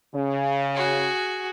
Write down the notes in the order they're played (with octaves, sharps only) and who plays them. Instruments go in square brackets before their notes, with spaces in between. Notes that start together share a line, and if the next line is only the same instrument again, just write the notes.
[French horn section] C#3
[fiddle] F#4 G#4